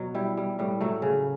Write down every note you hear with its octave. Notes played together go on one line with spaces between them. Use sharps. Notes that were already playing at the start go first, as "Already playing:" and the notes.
Already playing: B2 F#3
G3 E4
G3
A2 G3
F#3 A3
C#3